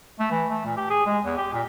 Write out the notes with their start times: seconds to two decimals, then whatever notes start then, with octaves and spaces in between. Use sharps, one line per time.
0.19 A3
0.31 E3
0.50 A3
0.65 A#2
0.77 G4
0.90 G#4
1.06 G#3
1.24 E2
1.38 G4
1.53 A#2